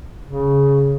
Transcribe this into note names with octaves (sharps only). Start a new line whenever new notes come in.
C#3